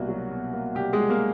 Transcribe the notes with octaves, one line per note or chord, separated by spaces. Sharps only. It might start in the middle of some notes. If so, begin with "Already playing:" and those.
Already playing: C2 B2 A#3 F#4
F#3
B2
A#3
C2 G4
G#3 G#4
F#3
A#3 A#4